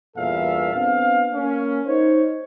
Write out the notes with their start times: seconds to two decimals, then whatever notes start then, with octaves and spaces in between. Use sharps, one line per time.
0.17 E2 G2 A#2 A4 E5 F5
0.75 B3 C4 D4 F5
1.34 A#3 C#4
1.87 D#4 C5 C#5